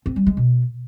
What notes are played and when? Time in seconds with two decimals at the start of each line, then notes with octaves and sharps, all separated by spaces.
0.06 C4
0.16 G3
0.27 G#3
0.37 B2